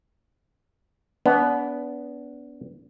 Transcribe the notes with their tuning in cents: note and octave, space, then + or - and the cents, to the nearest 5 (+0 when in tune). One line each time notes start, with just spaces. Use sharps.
B3 +0 D4 -35